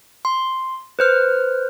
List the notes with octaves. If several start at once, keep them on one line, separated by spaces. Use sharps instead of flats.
C6
B4 C5 F6